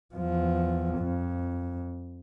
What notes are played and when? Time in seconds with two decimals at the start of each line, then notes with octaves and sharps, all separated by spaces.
0.15 E2 F3
0.99 F2